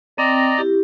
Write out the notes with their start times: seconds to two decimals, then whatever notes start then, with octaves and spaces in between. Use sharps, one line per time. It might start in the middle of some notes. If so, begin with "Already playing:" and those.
0.18 C4 D5 D#5 G5 A#5
0.58 E4 G4